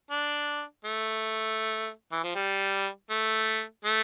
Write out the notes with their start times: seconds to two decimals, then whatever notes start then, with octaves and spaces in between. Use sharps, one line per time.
0.11 D4
0.85 A3
2.12 E3
2.23 F3
2.35 G3
3.10 A3
3.85 A3